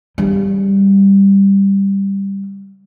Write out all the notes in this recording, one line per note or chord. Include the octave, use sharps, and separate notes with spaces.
C#3 G3